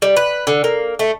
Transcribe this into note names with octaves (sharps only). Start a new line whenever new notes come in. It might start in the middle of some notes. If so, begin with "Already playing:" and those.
G3
B4
D3
A#3
A3